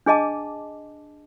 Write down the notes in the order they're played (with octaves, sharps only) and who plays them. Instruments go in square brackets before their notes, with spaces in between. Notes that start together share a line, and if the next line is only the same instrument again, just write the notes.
[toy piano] D4 G#4 D#5 A5 D6